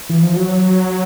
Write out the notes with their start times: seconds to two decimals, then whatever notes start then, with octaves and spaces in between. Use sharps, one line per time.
0.10 E3
0.23 F3
0.36 F#3